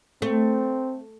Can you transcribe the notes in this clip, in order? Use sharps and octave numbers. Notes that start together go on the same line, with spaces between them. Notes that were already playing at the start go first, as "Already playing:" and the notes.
A3 C4